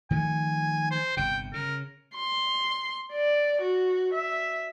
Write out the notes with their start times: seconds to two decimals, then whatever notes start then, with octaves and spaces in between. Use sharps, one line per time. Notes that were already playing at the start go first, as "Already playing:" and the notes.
0.11 D#3 F3 A3 G#5
0.91 C5
1.17 G1 C3 G5
1.54 C#3 A#4
2.15 C6
3.13 D5
3.62 F#4
4.14 E5